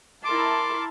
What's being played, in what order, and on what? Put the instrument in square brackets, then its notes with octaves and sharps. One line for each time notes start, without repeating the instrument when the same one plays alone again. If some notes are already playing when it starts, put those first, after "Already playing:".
[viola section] E4 A#4 A5 [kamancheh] C6 [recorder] D6